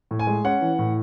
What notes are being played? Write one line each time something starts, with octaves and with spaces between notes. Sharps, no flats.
A2
G#5
G#3
C#4 F#5
E3
A2